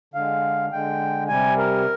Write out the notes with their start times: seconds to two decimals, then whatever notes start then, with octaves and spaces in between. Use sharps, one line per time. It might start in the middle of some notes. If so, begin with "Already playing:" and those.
0.14 D3 G#3 F5
0.72 D3 G#3 G5
1.28 C3 G3 G#5
1.57 A#4